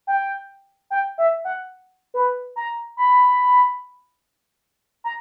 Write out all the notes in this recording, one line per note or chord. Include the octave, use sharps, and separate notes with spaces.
G5
G5
E5
F#5
B4
A#5
B5
A#5